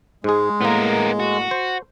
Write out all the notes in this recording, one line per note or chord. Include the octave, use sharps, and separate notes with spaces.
G#2 G#3 G#4
A2 A#3 B3 A#4
F#4
C5